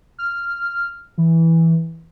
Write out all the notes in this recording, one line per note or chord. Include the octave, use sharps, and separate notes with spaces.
F6
E3